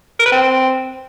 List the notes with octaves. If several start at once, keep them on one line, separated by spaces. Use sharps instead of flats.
A#4
B4
C4